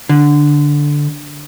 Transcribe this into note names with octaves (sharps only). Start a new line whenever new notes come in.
D3